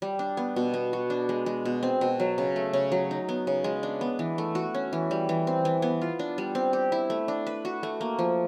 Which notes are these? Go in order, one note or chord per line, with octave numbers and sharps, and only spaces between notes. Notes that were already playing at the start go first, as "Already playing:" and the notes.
G3
D4
B3
B2
B3
F#4
D4
G#3
G#3
B2
C4
B2
F#3
C#3
A3
C#3
F#3
D#4
B3
C#3
G#3
D4
B3
E3
A3
F#4
C#4
E3
G3
E3
C4
E3
B3
F4
D4
G3
C4
G4
E4
A3
D4
B4
F#4
A3
A#3
F3